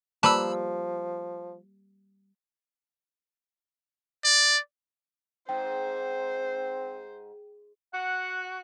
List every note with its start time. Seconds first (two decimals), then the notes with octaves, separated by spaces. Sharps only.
0.23 F3 G3 A#3 B4 A5 B5 E6
4.24 D5
5.49 G#2 C4 C5 G5
7.94 F#4 F#5